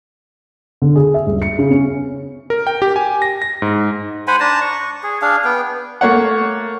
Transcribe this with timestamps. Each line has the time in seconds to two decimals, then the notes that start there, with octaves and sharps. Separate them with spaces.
0.82 D3
0.96 G#4
1.14 E5
1.26 D#1
1.42 C#7
1.59 C#3
1.70 C#4
2.50 A#4
2.67 G5
2.82 G4
2.96 G#5
3.22 A#6
3.42 A#6
3.62 G#2
4.28 C5 F#5 G#5 B5
4.40 D4 A5 A#5
4.61 C#6
5.03 G#4
5.22 D4 G#4 F5
5.45 B3 G5
6.01 A3 A#3 C#5 F#5